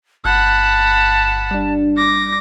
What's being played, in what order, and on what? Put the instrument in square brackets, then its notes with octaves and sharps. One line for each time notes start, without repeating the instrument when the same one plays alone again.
[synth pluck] G1 G6 [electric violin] F#5 B5 [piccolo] A5
[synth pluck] G3 D4
[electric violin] D6 A#6